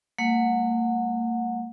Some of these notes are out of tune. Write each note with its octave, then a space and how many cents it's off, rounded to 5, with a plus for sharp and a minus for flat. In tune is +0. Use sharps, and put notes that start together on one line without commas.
G3 +35 A#3 -35 F#5 -20